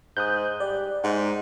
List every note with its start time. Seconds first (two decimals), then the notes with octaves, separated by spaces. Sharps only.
0.17 G#2 D#6 F#6 G6
0.60 G3 D5
1.04 G#2 D#4 F#5